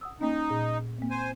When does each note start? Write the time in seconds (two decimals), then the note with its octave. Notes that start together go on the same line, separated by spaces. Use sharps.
0.01 F#5 D#6 E6
0.21 A#3 C#4 D#4
0.50 A#2
0.99 A#3 C4
1.11 C5 G#5